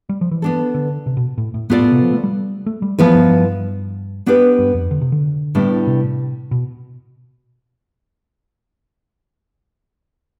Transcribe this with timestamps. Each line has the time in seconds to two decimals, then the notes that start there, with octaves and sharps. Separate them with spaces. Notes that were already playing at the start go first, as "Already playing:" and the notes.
0.09 G3
0.21 F3
0.31 E3
0.42 B3 D4 A4
0.74 D3
1.06 C3
1.17 B2
1.38 A2
1.54 A2
1.70 G2 B3 F4 A4 D5
1.81 A2
1.92 C3
2.03 F3
2.13 A3
2.24 G3
2.66 A3
2.82 G3
2.98 E3 F3 B3 E4 B4
3.14 G2
3.30 G2
4.26 B3 D4 G4 B4
4.59 G2
4.74 F2
4.91 D3
5.01 C3
5.12 D3
5.55 A2 G3 B3 D4
5.87 C3
6.51 B2